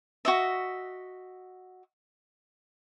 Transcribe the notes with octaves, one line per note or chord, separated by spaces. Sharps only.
F#4 D#5 E5